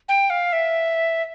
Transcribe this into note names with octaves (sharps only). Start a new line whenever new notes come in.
G5
F5
E5